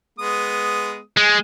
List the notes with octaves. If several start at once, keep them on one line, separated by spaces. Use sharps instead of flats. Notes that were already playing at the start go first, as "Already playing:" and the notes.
G#3 B3 D#6
G#3